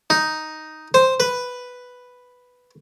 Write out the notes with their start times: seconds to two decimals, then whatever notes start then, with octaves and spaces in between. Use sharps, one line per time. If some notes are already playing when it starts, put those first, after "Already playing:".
0.10 D#4
0.94 C5
1.20 B4